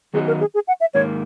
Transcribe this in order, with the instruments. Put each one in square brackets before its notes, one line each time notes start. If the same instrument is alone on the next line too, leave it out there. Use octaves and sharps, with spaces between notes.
[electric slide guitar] D#3 F#3 B3 D#4 F#4 [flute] G#4
[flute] A#4
G#4
G#4
F#5
E5
[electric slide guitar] G#2 D#3 A#3 [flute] C#5